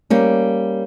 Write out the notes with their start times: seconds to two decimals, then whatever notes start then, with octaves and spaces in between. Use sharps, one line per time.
0.10 G3 A#3 C#4